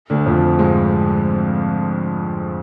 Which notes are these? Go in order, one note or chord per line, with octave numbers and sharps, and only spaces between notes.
D2 D3
F2 F3
G#2 G#3